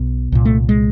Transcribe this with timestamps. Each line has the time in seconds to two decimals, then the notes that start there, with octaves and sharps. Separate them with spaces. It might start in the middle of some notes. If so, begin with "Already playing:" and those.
Already playing: B1 B2
0.32 C2 A#2
0.45 A3
0.69 G#3